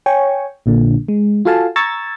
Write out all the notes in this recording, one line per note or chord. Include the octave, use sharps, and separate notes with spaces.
C#5 G5 G#5 C#6
A#1 A#2 D3
G#3
F4 F#4 A4 F5 G#5 A5
A#5 C#6 E6 G#6 A6